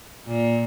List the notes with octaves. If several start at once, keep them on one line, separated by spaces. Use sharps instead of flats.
A#2